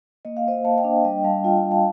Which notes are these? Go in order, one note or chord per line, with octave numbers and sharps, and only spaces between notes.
A#3 D#5
F5
A#3 C5 D#5
A#3 F5 A5
D#5 G5
D4
G3 D#5 G5
G3 F5 A5
F4 D#5 G5
F4
F5 A5